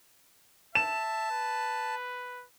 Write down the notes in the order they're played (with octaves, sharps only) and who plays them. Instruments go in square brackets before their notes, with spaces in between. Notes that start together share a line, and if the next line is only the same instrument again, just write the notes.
[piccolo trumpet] E5 [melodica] A5 [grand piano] E7
[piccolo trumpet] B4